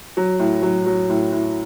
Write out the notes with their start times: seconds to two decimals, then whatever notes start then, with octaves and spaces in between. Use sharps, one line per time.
0.17 F#3
0.39 A2
0.62 F#3
0.86 F#3
1.09 A2
1.32 A2